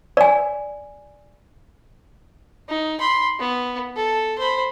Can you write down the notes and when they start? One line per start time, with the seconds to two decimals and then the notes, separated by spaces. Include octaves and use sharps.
0.17 D5 G#5
2.69 D#4
3.00 B5 C6
3.39 B3
3.96 A4
4.39 C5 B5